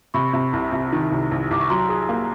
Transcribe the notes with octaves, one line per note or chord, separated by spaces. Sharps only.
C3 B5 C#6
C3
C2
C3
D#3
C2
C2
C2 D6
C#6
F#3 A#5 C6
G#4
A#3